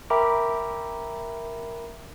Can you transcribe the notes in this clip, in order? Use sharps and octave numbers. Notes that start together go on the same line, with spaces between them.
A#4 E5 G5 A#5 B5 D6